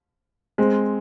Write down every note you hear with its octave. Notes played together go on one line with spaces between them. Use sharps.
G#3 C4